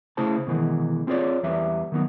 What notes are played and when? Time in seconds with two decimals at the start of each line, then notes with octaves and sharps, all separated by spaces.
0.17 C#3 A3 E4 G#4 C5 A5
0.47 B2 D#3 E3 G#3
1.07 C4 F4 G#4 C#5 D5
1.43 E2 G3 B4 E5
1.92 D#3 F#3 B3 D#4